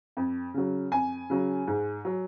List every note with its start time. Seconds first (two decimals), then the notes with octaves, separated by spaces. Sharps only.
0.17 F2
0.54 C#3 F#3
0.92 F2 G#5
1.30 C#3 F#3
1.67 G#2
2.05 F#3